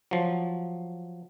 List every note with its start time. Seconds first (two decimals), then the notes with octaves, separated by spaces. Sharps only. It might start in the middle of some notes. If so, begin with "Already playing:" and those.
0.11 F3 F#3